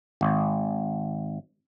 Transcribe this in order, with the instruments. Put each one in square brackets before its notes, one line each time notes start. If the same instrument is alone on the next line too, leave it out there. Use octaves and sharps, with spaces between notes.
[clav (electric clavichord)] G#1